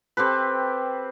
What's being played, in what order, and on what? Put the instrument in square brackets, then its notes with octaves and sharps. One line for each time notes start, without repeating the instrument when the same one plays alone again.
[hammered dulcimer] C4 G4 A4 B4